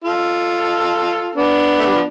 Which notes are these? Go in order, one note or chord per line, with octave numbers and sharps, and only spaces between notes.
F4 A4
B3 D4
A3
G3
F3